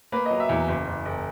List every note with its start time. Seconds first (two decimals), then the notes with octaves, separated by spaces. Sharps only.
0.12 A#3 B4
0.26 F#3 D#5
0.40 E5
0.49 E2
0.68 F#1
0.87 F#1
1.05 F#1